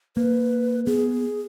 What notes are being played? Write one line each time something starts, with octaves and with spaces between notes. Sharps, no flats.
A#3 B4
B3 G#4